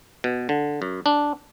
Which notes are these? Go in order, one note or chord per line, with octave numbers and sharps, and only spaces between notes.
B2
D3
F#2
D4